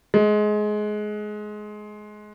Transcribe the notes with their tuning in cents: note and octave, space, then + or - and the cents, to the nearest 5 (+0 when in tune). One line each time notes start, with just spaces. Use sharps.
G#3 +20